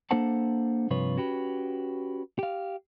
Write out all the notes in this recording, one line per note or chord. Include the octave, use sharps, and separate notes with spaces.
A#3 D4 A4 C5 F#5 A5
G2 C3 F3 F4 B4 C#5
C#4 F#4 G4 B4
G4 F5